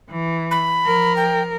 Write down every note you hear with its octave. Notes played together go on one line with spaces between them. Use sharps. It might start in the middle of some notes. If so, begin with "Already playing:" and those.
E3
B5
F3 A#4
G5